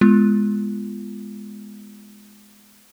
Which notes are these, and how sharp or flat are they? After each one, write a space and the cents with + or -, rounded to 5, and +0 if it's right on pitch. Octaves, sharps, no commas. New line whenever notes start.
G#3 +0 B3 +0 F4 -25